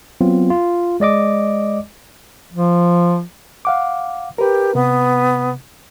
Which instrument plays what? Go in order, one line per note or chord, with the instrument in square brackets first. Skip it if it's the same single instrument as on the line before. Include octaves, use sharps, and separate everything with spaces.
[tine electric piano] F#3 B3 C4 F4
F4
G#3 D5 D#5 D6
[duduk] F3
[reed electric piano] F5 F#5 D6
[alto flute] G4 [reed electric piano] A#4 B4
[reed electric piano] C3 [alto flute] B3